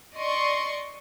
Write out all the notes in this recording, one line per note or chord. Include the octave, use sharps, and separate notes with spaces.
D5 D#5 C6 C#6